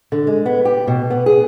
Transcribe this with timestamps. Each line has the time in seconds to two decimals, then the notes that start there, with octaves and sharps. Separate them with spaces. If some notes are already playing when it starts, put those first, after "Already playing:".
0.12 D3
0.27 G#3
0.46 B3
0.65 G4
0.87 B2
1.10 B3
1.26 G#4